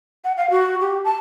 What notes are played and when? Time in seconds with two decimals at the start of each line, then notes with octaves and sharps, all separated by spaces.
0.24 F#5
0.37 F5
0.50 F#4
0.80 G4
1.04 A5